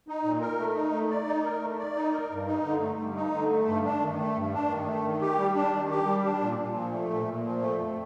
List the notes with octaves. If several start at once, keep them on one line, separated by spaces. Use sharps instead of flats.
D#4
A#2
A#4
A3
D#4
A3
D5
D#4
A#4
A3
D5
D#4
A#4
G2
D#4
D3
A3
G2
D#4
D3
A3
G2
D4
D#3
A3
G2
D4
D#3
A3
D#3
G4
G3
D4
D#3
G4
G3
D4
A#2
A#2
F3
A3
A#2
A#2
F3
A3
F2